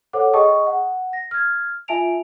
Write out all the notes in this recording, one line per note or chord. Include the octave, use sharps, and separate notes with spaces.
A4 C5 C#5 F#5 D6
G#4 D#5 G5 A5 C#6 D#6
F#5
A#6
F6 G#6
F4 E5 G#5 A5 D7 F7